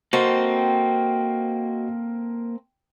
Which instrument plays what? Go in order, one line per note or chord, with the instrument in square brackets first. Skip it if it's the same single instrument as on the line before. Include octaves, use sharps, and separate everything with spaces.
[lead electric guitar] A#3 A4 [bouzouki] C4 [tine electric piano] F#4 D#5